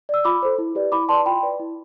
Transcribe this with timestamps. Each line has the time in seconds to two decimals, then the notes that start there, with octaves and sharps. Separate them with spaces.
0.09 D5 E6
0.25 F4 B5 D6
0.42 A4 C5
0.58 E4
0.75 G4 B4 D5
0.92 E4 B5 D6
1.09 B4 D5 A5 C6
1.26 F4 G5 B5
1.43 B4 D5
1.60 E4